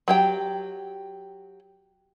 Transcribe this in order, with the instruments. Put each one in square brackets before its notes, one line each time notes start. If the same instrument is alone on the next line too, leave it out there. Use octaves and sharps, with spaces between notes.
[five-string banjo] F#3 G4 G5